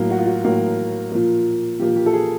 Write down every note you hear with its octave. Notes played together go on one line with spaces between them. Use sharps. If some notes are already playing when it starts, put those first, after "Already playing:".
Already playing: A2 F#3 A#3
F#4
F4
F#4
A2 F#3 A#3
A#2 F3 A#3
A#2 F3 A#3 G4
G4
A4
G#4